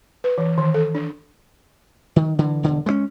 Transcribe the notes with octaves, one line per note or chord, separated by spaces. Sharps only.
B4
E3
D#3
A4
D4
D#3
D3 E3
E1 D3
G#3 A3 C#4